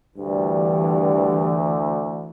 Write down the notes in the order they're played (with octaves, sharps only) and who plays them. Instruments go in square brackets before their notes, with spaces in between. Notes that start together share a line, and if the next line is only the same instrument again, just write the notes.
[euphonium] D2 [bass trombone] G2 [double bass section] E3